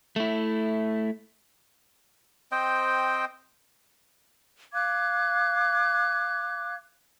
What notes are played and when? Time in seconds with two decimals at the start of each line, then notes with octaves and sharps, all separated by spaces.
0.16 A3 E4
2.52 C4 C5 D#5 G5
4.73 F5 D6 F#6 G#6